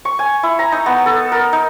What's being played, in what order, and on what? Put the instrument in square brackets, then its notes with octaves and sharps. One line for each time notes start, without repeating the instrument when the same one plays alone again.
[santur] C#6
G#5
E4
A#5
D#4
B3
A4
A#4
D#4